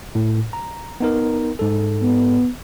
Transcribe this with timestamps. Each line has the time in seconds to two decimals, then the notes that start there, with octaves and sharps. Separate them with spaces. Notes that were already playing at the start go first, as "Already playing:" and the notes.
0.15 A2
0.53 A#5
1.00 B3 D#4 A#4
1.59 G#2 A4
2.02 B3